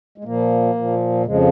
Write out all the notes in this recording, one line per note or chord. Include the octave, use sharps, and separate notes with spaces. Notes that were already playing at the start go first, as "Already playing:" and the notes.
G#3
A#2 F3 A#3
A#2 F3
F2 C#3 F3 G#3